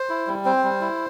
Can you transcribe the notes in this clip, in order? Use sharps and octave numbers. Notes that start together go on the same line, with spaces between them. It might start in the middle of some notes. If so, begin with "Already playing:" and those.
Already playing: C5
E4
G3
C4 C5
G3
E4